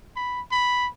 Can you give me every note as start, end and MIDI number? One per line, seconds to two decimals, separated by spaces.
0.16 0.41 83
0.52 0.88 83